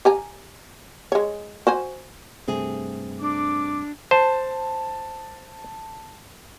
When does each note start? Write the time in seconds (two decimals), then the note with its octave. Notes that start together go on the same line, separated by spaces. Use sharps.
0.05 G4 G#5 A#5
1.12 G#3 C#5
1.67 F#4 C5 G#5
2.48 G2 C3 A3 C4 G#4
3.21 D4 D6
4.11 C5 A5